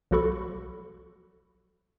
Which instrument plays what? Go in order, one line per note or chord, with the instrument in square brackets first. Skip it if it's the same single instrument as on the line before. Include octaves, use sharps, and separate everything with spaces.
[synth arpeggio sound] B1 F3 F#4 A4 B5 C#6